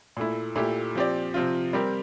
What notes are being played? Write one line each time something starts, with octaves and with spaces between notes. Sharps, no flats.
A#2 A3 E4
A#2 A3 E4 G4
F3 C4 G4 D5
C3 F3 C4 F4
G3 C4 G4 A#4